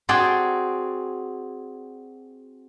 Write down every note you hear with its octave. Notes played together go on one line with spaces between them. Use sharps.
C4 F#4 G#4 D5 G5 A5